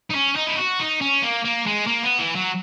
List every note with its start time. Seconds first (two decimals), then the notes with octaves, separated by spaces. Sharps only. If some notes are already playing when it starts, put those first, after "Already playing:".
0.11 D#4
0.15 C#4
0.36 D#4
0.48 E4
0.58 F#4
0.80 D#4
1.01 C#4
1.22 A#3
1.44 A#3
1.66 G#3
1.87 A#3
2.03 B3
2.19 E3
2.36 F#3